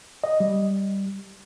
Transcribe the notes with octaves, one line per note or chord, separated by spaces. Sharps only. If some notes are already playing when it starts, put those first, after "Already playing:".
D#5
G3